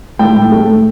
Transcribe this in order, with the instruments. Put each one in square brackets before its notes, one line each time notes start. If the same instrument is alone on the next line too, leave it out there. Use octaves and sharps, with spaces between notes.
[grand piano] A2 G5
A2
A3
A2